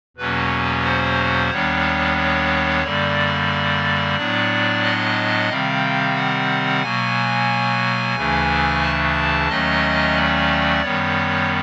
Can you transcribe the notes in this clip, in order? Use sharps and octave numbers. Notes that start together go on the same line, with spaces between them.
E2 B2 F#3 A#3 C#4 B4
C5
D#2 D#3 G3 B3 D4 C#5
C#5
F#2 D3 G3 A#3 D5
A2 F#3 B3 D4
D#5
C3 D#3 G3 C4 F5
F#5
B2 F#3 A#3 G#5
D2 C#3 E3 A3 D4
A5
D#2 D#3 F#3 A3 C#4 D#5
D5
F#2 D#3 G3 B3 C#5